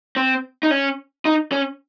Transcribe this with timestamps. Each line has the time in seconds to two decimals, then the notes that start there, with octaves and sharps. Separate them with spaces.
0.16 C4
0.63 D#4
0.71 C#4
1.25 D#4
1.52 C#4